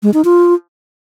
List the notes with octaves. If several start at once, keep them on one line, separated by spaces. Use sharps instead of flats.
G#3
D#4
F4